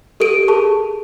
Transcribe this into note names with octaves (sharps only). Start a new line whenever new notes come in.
G4 A4 A#4 D7 D#7
G#4 A4 A5 C#6